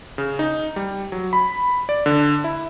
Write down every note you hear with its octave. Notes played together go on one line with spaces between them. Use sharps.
C#3
D#4
G3
F#3
B5
D5
D3
E4